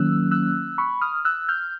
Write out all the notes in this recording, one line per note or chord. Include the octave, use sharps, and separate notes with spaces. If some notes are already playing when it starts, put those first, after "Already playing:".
Already playing: D#3 F#3 A#3 C#4 E6 F#6
E6 F#6
B5 C#6
D#6 F6
E6 F#6
F6 G6